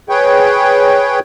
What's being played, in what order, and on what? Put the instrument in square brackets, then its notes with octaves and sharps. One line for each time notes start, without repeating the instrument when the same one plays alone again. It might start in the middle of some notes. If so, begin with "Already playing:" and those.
[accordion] G#4 B4 C#5 G5